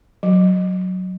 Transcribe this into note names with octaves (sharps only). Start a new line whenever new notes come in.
F#3